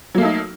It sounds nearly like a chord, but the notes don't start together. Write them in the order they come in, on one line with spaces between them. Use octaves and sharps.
F#3 A#3 A3 D#4